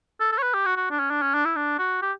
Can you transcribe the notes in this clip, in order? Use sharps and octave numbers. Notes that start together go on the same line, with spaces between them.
A4
A4
C#5
B4
G4
F#4
F#4
D4
C#4
D4
C#4
D4
E4
D4
F#4
G4